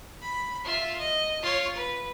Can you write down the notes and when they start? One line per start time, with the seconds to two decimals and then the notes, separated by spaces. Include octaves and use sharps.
0.22 B5
0.64 F4 E5
0.99 D#5
1.42 F4 C#5
1.75 B4